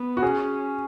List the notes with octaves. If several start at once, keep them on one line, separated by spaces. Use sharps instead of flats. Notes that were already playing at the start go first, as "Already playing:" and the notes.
Already playing: B3
F#4
C#4 G#4